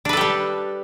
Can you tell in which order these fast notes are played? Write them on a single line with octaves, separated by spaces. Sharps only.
D4 B4 A4 G4 G3